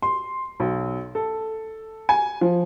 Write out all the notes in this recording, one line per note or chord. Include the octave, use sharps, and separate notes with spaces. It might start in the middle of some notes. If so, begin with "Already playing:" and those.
C6
B1
A4
G#5
F3